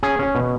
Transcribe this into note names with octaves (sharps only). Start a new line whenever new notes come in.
C#4 G#4
C#4
B2